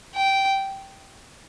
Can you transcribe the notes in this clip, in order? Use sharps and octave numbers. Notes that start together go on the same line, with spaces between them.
G5